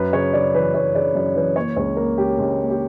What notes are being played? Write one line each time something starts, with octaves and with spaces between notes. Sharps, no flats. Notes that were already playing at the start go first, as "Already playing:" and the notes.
Already playing: F#2 B4
C#3 C#5
C#3 D5
E3 B4
F#2 C#5
C#3 D5
F#2 D5
E3 B4
A#3 C#5
C#2 C#5
A#3 A#4
C#2 G4
C#2
A#3
G4